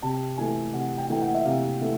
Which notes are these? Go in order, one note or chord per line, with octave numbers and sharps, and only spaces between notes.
C3 A5
E3 A3 G#5
C3 F#5
G5
E3 A3 G5
F#5
E5
C3 F5
E3 A3